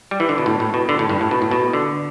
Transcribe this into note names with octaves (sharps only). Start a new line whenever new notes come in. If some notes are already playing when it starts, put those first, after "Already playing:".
G3
E3
D3
B2
A2
A2
B2
D3
A2
G2
A2
B2
A2
B2
D3